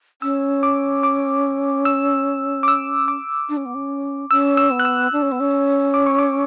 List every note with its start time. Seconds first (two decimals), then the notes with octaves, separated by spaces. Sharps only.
0.22 C#4 E6
0.63 D6
1.03 D6
1.85 E6
2.63 D6
2.68 E6
3.08 D6
3.49 D4
3.57 C#4
3.65 B3
3.75 C#4
4.31 C#4 E6
4.57 E6
4.71 B3
4.80 F#6
4.85 E6
5.12 D4
5.22 C#4
5.32 B3
5.40 C#4
5.94 D6
6.06 C#6
6.19 D6